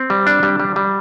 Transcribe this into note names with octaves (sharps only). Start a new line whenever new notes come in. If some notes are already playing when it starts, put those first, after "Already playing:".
Already playing: C4
G3
D4
G3
G3
G3